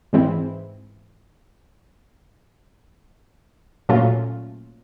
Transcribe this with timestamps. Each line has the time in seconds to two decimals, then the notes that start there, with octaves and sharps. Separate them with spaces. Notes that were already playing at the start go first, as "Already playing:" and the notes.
0.13 G#2 E3 G#3 C4 E4
3.89 A#2 F#3 A3 C#4 F4